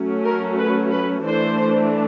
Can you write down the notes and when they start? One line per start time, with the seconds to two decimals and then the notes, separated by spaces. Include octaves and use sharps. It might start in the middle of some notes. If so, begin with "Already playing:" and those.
Already playing: F#3 A3 C#4
0.24 A#4
0.57 B4
0.91 B4
1.23 E3 A3 D4 C5